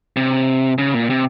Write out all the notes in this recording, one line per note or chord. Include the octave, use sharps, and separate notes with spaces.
C3
C#3
A#2
C3